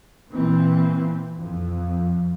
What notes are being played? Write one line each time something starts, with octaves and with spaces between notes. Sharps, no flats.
A#2 E3 C4
F2